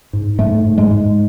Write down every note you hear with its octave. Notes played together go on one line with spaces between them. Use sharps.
G#2
G#2 A3
G#2
G#3
G#2